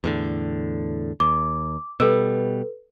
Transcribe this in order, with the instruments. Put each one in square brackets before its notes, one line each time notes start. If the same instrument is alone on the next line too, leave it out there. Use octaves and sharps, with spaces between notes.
[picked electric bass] E2 A2 D3
[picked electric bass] D#2 [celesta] D6
[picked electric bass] B2 G3 [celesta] A4 B4